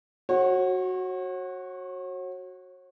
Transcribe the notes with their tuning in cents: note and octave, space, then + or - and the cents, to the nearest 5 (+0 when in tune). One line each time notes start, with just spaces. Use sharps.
F#4 +0 C#5 -40